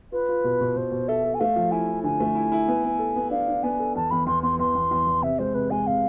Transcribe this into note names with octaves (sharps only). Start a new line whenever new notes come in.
F4 B4
F4
B2
B2
B2 C5
B2
A4 E5
A4
G#5
A3 F5
F3
E4 G#5
E4
D3 G#5
A3
E4
E4
B3
B3
A4
B3
D4 F5
D4
B3 G#5
A4
E2 A5
E2 B5
E2 C6
B3 C6
E2 C6
E2
E2
E2
C3 E5
G#3 C5
C3 B4
G#3 G#5
C3 F5